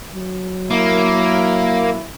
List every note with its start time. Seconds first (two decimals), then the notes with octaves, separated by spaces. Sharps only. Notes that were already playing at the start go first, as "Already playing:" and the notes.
0.14 F#3
0.71 A#3 E4